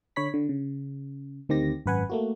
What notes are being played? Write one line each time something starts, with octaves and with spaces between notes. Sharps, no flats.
D3 C#5 B5 B6
D3
C#3
D2 D#3 C4 G4 A#6
G#1 F#2 B4 F#5 G#5
A3 A#3 F#4